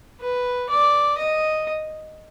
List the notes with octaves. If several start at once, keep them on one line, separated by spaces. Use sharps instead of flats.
B4
D5
D#5